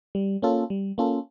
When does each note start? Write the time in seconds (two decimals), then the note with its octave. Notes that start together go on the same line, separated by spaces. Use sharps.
0.15 G3
0.42 A#3 C#4 F4 A4
0.70 G3
0.98 A#3 C#4 F4 A4